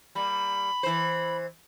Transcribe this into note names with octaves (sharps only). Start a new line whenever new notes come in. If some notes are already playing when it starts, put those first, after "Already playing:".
G3 A#3 B5
E3 C5